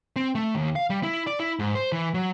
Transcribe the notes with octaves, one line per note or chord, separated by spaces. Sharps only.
C4
A3
D#2
F5
G3
E4
D5
E4
G#2
C5
E3
F#3